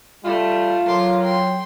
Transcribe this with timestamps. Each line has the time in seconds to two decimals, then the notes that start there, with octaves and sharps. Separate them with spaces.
0.25 G3 A3 F4
0.87 F#3 A#4 C6 D6
1.21 G5 C6